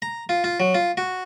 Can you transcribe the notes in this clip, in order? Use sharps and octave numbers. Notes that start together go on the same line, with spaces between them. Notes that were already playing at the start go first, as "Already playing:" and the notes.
A#5
F4
F4
F#3
F4
F#4